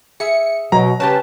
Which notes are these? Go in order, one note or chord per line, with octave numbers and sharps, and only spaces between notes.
G#4 E5 C#7
B2 F#3 A#5
C#3 G3 C#4 G4 B4 A5